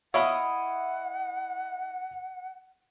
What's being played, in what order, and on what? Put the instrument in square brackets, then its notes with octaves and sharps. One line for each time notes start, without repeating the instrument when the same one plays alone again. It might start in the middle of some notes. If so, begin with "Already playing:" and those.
[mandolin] E4 D#5 D#6 [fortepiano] C#5 F5 B5 [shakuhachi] F#5